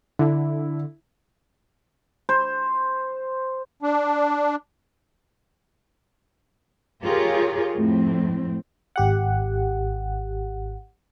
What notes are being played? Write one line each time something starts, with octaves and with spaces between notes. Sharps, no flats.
D3 E4
C5
D4
F4 G4 G#4 A#4 C#5
F2 A2 C4
G#1 G4 F#5